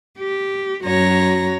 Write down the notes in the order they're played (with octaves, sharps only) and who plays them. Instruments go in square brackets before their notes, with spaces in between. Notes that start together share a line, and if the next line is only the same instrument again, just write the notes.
[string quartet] G4
F#2 F#3 F#4 C#5 A#5 A#6